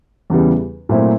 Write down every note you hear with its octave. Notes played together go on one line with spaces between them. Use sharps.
E2 C#3 E3 G3
A#2 F#3 A3 C4 E4